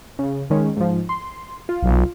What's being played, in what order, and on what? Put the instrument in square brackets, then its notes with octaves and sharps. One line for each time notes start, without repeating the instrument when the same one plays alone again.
[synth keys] C#3
D#3 G#3 C#4
G#2 F3
C6
F4
[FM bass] B1